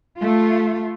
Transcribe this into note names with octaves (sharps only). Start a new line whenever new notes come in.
A3 F4